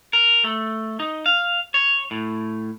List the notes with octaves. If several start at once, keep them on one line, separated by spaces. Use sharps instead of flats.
A#4
A3
D#4
F5
C#5
A2